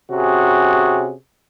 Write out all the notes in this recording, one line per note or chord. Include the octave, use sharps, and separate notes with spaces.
C3 C#4 F#4 G#4